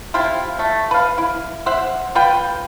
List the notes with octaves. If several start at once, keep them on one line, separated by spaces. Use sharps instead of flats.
C3 C4 E4 F4
A3
B4 F5
E4
C5 E5 F#5
F4 B4 G5